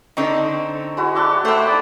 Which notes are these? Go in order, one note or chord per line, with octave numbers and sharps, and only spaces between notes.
D3 C4 D#4 C#6 D6
G#3 E4 F#4
D4 E4 G4 E5
A3 C5 G5
D#4 D5 D#6